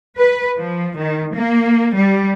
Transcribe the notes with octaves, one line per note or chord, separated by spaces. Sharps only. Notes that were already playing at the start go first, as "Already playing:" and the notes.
B4
F3
D#3
A#3
G3